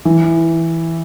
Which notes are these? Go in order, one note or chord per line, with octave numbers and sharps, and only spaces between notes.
E3